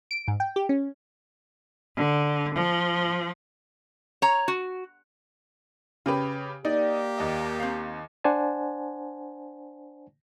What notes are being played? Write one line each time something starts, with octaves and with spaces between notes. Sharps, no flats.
D7
G#2
G5
G4
C#4
D3
F3
C#5 A#5
F#4
C#3 G4 B4 G#5
A#3 D#4 G4 D5
D#2 D#5
C4 F5
D4 C5 D5 F#5 G#5 A5